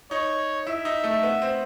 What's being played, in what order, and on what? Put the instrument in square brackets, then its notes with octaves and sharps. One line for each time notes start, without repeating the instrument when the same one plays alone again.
[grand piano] D#4 [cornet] C#5
[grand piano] E4 [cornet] E5
[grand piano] D#4
A3
B3
C4